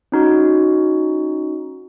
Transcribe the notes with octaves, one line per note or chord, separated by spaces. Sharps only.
C#4 D#4 F#4